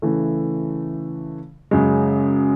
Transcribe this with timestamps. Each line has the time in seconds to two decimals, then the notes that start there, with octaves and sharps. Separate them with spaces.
0.02 C#3 E3 A3
1.71 F#2 C#3 G#3